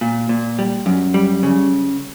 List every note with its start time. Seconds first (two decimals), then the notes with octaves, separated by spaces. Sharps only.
0.01 A#2
0.29 A#2
0.59 G3
0.86 F#2
1.14 G3
1.43 C#3